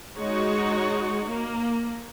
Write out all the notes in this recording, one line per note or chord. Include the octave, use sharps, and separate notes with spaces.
G#3 D#4 F#4 C#5 F#5
A#3